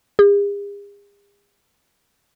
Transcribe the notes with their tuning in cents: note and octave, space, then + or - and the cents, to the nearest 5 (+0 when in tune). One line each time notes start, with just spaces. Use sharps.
G#4 -45